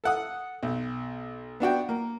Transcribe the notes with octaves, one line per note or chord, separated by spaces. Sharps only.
A4 F#5 D#6
B1
B3 D4 F#4 G5
A#3